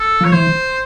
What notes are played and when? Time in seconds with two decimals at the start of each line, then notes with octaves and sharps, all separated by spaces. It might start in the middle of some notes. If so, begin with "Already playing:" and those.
Already playing: A4
0.20 F3 C#5
0.32 E3 C5